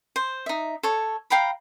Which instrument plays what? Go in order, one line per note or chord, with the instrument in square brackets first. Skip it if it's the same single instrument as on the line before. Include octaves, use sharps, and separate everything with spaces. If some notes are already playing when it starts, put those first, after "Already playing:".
[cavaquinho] C5
D#4 E5
A4 C#5
F5 G5 A#5 B5